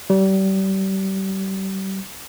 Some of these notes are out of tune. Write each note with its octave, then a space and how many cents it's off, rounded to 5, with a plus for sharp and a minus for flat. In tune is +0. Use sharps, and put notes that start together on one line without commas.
G3 -35